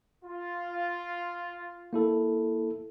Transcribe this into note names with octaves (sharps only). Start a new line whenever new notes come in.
F4
A#3 E4 A4